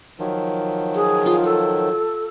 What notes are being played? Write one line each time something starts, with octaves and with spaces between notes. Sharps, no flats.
D#3 F3 F#3
G#4
F4
A4